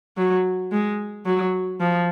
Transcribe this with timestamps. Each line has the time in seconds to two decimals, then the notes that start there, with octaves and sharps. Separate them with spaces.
0.17 F#3
0.72 G#3
1.25 F#3
1.80 F3